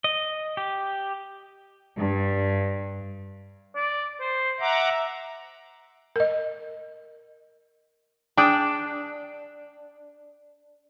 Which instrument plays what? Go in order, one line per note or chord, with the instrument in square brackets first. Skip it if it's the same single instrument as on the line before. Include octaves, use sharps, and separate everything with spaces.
[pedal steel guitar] D#5
G4
[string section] G2
[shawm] D5
C5
[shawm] E5 [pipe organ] F#5 A#5 D6
[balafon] A#4 D#5
[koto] D4 [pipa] G#4 D5 G5